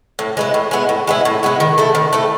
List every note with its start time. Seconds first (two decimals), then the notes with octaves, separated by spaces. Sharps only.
0.19 A2
0.37 G#3 B3 E4
0.54 A2
0.71 G#3 B3 E4
0.89 A2
1.07 G#3 B3 E4
1.25 A2
1.43 G#3 B3 E4
1.60 D#3
1.78 A3 E4 A4
1.95 D#3
2.13 A3 E4 A4